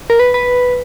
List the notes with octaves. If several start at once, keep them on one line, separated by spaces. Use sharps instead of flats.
A#4
B4
B4